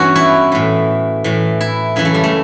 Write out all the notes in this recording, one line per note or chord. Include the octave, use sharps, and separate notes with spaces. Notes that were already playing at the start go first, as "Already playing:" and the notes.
Already playing: G2 E3 B3 C#4 F#4
E4
A2 E3
A2 E3
E4
F#2 C#3 E3 E4
A3
G3
A3